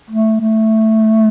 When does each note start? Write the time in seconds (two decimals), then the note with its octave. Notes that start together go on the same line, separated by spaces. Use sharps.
0.11 A3
0.41 A3